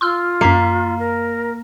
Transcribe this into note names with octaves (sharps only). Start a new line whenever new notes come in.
F4 C6 E6 F6
F#2 A#3 B6 C7
A#4